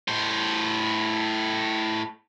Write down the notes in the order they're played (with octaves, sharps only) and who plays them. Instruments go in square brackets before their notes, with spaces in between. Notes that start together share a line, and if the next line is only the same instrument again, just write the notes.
[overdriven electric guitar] A2 C5